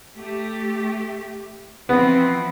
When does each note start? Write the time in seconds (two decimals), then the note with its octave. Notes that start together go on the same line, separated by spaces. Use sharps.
0.17 A3 G4
1.89 E3 F3 B3 C4